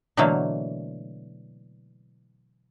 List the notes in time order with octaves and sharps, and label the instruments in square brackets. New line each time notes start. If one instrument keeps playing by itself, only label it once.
[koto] B2 D3 E3 F#3 A3 A#3